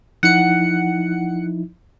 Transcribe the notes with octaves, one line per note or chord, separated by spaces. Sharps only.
F3 D#4 E4 F#5 C#7